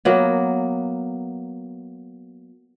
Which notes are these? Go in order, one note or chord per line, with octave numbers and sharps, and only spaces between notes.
F#3 A#3 B3